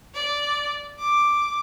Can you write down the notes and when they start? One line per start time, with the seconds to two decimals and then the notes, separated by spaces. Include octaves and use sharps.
0.14 D5
0.99 D6